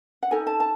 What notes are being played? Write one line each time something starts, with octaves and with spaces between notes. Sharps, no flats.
F#5
D#4 A4 G#5
A5
A5